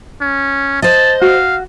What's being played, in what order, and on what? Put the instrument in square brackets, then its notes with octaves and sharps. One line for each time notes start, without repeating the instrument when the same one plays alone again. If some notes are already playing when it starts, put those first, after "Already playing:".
[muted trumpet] C#4
[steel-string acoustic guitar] C5 D#5 [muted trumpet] A5
[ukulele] F#4 [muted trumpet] F5